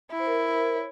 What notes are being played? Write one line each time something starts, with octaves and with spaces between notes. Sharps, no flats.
E4 E5
C5
A#4
C5
C#5